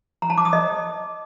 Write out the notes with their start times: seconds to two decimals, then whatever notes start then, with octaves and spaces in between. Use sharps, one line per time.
0.22 A#5
0.30 A5
0.38 D6
0.45 D#6
0.53 D#5